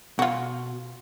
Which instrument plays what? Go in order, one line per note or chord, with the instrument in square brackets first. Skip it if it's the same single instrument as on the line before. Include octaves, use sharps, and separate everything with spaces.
[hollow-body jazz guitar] B2 [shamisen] F4 F#4